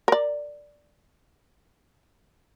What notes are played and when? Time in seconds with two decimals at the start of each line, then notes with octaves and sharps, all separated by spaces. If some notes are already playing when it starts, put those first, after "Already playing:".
0.08 A#4 D5